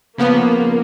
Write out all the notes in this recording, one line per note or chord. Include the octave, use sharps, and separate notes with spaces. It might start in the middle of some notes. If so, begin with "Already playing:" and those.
C#3 F3 A#3 B3